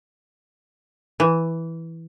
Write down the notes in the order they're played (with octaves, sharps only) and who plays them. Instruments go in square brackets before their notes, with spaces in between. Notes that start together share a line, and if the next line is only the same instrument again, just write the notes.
[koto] E3